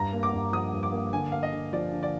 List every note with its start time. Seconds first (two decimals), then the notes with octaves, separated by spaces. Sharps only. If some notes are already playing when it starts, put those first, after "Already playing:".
Already playing: G2 A#5
0.13 A#3
0.23 D6
0.33 G2
0.52 F3 D#6
0.73 G2
0.83 D6
0.93 A#3
1.13 D3 G#5
1.32 A#3 F5
1.43 D#5
1.52 D3
1.73 F3 D5
1.92 D3
2.03 D5